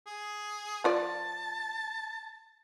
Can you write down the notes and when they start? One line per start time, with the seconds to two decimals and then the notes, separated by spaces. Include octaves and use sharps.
0.07 G#4
0.84 F3 F4 D5 A5